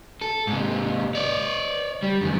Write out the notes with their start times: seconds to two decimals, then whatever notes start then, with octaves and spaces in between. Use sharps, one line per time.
0.21 A4
0.47 G#2 C3
1.15 C#5 D5
2.03 G3
2.21 F#2 D#3